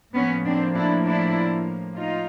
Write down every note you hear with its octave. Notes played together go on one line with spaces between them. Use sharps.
A2 F3 A#3 B3 C#4
C4 D4
D4 E4
D4 E4
D#4 F4